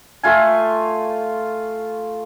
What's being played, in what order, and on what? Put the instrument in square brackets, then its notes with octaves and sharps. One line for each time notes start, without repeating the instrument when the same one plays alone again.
[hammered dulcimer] A3 F4 G#5